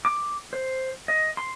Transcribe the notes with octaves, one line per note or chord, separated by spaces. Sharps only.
D6
C5
D#5
C6